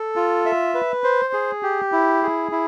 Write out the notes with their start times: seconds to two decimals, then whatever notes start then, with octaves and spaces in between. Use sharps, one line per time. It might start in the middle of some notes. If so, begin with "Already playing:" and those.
Already playing: A4
0.16 F4
0.46 E5
0.74 B4
1.04 C5
1.33 G#4
1.63 G4
1.92 E4
2.23 G#4
2.52 E4